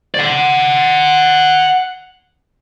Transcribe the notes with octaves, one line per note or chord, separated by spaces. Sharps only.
D5 F#5